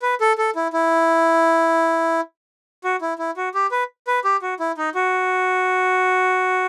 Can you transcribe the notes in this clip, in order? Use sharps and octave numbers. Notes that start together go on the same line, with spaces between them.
B4
A4
A4
E4
E4
F#4
E4
E4
F#4
G4
B4
B4
G4
F#4
E4
D#4
F#4